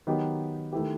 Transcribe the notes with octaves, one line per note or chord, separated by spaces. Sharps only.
D#3 F#3 B3 D#4 G4
D#3 A3 E4 G4